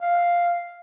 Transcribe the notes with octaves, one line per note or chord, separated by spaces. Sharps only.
F5